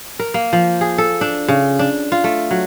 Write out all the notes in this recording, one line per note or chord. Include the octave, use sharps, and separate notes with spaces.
A#4
A#3
F3
G#4
A4
D4
C#3
D4
F4
A3
F#3